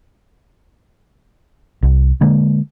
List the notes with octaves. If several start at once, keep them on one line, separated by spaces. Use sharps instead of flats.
C2
D3 G#3 A#3